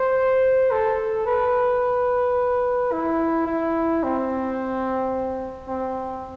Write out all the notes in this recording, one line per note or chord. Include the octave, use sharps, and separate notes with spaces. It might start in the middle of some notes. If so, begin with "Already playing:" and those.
Already playing: C5
A4
B4
E4
E4
C4
C4